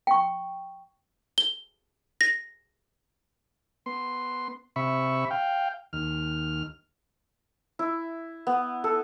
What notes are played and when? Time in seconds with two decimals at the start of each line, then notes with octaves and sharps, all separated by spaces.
0.07 G5 C#6
1.38 G7
2.21 A#6
3.86 B3 C6
4.76 C3 E5 B5 C#6
5.31 F5 G5
5.93 D#2 F6
7.79 E4
8.47 B3
8.84 A4